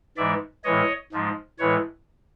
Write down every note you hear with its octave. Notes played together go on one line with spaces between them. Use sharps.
G#2 E3 G#3 D5 E5
A2 E3 G#3 C#5 D#5
G#2 F3 G#3
A2 E3 G#3 B4 C#5